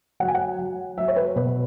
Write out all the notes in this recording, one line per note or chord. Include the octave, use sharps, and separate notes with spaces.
F#3 F#5
G#5
F#5
F#3
F#3 E5
C#5
B4
B2 B4